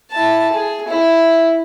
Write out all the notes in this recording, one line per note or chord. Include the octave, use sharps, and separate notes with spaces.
E4 A5
G#4
E4